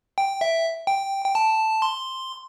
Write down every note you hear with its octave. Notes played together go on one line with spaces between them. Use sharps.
G5
E5
G5
G5
A5
C6